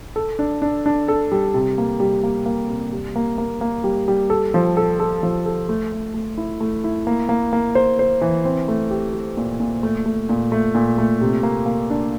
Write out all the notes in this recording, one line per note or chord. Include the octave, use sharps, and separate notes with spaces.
A4
D4
D4
D4
A4
G3
C3
A#3
G3
A#3
A#3
C3
G3
A#3
A#3
A#3
G3
G3
A4
F3
A4
A4
F3
A4
A3
A3
A3
E4
A3
E4
A#3
A#3
A#3
C5
C5
E3
C4
A3
G4
G4
A#2
A#2
A3
A3
A#2
A3
A#2
A3
C3
A#3
A#3
D4